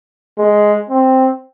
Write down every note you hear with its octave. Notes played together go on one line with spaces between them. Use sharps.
G#3
C4